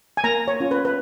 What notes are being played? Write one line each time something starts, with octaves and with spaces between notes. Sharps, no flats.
G#5
A#3 A#5
C#5
C#4 F4
B4
B4